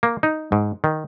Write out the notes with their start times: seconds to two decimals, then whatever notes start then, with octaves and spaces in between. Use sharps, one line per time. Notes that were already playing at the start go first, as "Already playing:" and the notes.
0.03 A#3
0.23 D#4
0.52 G#2
0.84 D#3